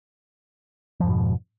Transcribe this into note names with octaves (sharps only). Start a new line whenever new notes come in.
F2 G#2 B2 F3